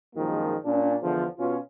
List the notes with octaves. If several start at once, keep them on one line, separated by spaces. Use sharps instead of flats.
A#1 F#2 D#3 F3 G#3 A#3
A#2 C#4 D4
E2 D3 F3
B2 C#4 F4